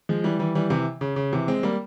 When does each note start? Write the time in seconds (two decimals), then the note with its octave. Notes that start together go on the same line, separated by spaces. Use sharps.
0.09 F3 G#3
0.24 E3 G3
0.39 E3 G3
0.55 E3 G3
0.70 C3 E3
1.01 C#3
1.16 C#3
1.33 C3 E3
1.48 G#3 C4
1.63 G3 A#3